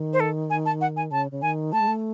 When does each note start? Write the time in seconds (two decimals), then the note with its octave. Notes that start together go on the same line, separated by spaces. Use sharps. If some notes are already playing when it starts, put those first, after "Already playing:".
Already playing: D#3
0.13 C5
0.20 A4
0.50 G#5
0.66 A5
0.81 F#5
0.97 G#5
1.11 C#3 A5
1.31 C#3
1.42 D#3 G#5
1.73 A3 A5
1.81 G#3
1.88 A3